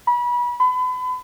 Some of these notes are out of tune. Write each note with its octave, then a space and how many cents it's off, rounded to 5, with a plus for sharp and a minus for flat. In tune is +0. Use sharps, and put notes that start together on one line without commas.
B5 -30
B5 +35